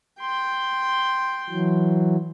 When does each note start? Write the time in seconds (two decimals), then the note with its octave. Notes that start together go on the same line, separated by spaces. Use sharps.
0.20 G5 C6
1.50 E3 F#3